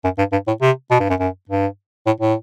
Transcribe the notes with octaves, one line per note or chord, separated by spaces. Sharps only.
F#2
G2
G2
A2
C3
B2
G2
F#2
F#2
G2
A2
A2